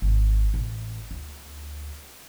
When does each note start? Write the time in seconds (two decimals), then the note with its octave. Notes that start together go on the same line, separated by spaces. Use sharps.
0.02 G#1
0.54 A1
1.11 D2